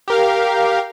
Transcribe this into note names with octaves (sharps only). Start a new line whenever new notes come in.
G4 A#4 F5